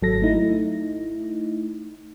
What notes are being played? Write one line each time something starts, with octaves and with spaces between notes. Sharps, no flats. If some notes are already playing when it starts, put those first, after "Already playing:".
G#1 F#3 A4 A#6
A3 D#4 E4